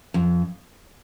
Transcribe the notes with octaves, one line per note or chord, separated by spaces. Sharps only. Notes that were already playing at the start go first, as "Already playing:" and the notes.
F2